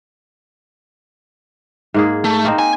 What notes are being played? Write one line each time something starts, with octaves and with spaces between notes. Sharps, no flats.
G#2 A#3 G#4
A3
A#3 C4 D#4
G#5